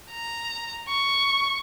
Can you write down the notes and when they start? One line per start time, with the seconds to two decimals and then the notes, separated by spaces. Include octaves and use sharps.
0.12 A#5
0.89 C#6